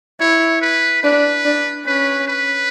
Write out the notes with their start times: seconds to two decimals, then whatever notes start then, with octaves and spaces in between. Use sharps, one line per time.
0.20 E4 C#5
0.62 B4
1.03 D4 B4
1.45 D4
1.86 C#4 B4
2.28 B4